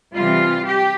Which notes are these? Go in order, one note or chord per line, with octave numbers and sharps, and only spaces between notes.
C3 E3 G3 F4
G4